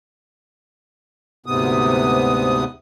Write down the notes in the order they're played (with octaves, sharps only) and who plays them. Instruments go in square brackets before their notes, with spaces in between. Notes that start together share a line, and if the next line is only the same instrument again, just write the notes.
[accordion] D2 G#2 C3 B3 D#6